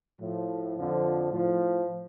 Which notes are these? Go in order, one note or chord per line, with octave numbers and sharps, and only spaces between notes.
A2 F3
F2 D3 F3
A2 F3